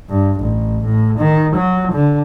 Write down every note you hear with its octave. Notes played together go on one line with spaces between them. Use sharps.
G2
A1
A2
D#3
F#3
D3